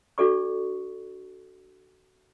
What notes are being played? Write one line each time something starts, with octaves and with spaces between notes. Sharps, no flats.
D4 F#4 A4 D5 C#6